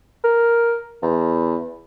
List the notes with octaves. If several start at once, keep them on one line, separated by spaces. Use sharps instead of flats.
A#4
E2